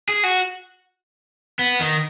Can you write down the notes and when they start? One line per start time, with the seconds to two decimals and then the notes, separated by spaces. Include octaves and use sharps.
0.09 G#4
0.23 F#4
1.59 B3
1.80 D#3